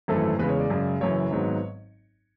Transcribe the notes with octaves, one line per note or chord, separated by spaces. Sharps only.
G#1 F#2 E3 A3 A4
E2 C#3 G#3 B4
C#5
D5
F#2 C#3 G#3
F#1 F#2 E3 C#5
G#1 G#2 F#3 B3